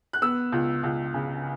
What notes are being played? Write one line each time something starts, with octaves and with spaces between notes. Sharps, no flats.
F#6
B3 E6
C#2
C#2
C#3